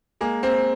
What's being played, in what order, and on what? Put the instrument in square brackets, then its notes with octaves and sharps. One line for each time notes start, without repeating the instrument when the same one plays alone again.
[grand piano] G#3 A#3 [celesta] G#5
[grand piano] A#3 C4 [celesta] C5